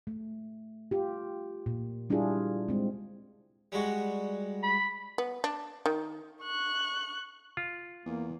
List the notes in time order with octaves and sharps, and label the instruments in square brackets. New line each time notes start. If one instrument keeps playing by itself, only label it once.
[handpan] A3
F4 G4
A#2
G3 D4 E4 F4 G#4
G#3 C4
[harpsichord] G3 G#3 F#4
[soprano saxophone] B5
[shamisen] B3
D4
D#3
[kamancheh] C#6 F#6
[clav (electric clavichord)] F4
[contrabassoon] E2 [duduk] A#3